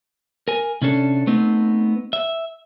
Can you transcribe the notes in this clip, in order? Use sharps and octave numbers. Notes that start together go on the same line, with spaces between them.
A#4 G#5
C3 C#4 D4 A4
A3 B3 C4 D#4
E5